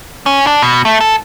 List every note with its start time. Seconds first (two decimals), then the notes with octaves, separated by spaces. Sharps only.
0.26 C#4
0.47 D4
0.63 B2
0.85 A3
1.00 A4